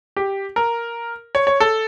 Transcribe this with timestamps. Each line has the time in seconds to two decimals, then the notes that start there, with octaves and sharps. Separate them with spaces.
0.17 G4
0.56 A#4
1.35 C#5
1.47 C#5
1.60 A4